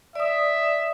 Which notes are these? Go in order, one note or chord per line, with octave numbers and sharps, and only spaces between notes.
D5 E5 D#6